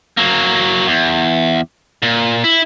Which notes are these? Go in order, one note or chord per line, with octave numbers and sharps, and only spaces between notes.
F#3 A#3
E2
A#2
E4